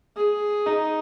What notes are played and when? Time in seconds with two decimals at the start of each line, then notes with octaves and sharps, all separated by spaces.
0.17 G#4
0.67 D#4